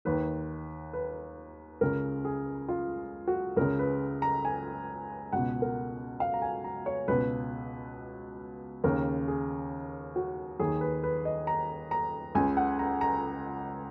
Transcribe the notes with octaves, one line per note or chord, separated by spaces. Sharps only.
D#2 D#3 B4
B4
C#2 C#3 A#4
G#4
F4
F#4
C#2 C#3 A#4
B4
A#5
G#5
C#2 B2 F#5
A#4
F5
A#5
G#5
A#5
C#5
C#2 B2 B4
D#2 C#3 A#4
G#4
F#4
D#2 D#3 G#4
B4
B4
D#5
A#5
A#5
C#2 C#3 G#5
F#5
A#5
A#5